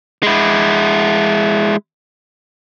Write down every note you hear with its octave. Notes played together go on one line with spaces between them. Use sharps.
G#3 E4